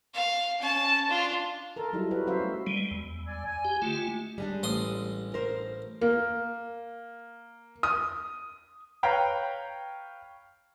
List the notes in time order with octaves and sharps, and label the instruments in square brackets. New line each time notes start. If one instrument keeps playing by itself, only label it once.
[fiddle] F5
C#4 A5
D4 F4
[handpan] A4 A#4
F#3 G3 D#4 E4
D#4 F#4 B4
F#3 C#4 F#4 C5 E5 F5
G3 A3
[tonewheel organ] G3 G#3
E2
[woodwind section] D5 G#5
G#5
[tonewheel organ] G4
[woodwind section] D3 G#3 G4 [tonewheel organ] A3 F4
[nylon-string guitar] G3 G#3 D4
[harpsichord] A1 C6 D#6
[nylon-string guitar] A#4 C5
[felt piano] A#3
D#6
[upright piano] B4 C#5 F5 G5 A#5 B5